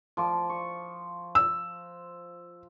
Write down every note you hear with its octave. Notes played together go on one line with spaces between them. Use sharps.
F3 C6 D6
C#6
E6